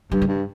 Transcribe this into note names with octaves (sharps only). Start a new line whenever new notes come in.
G2 G3
D#3
G2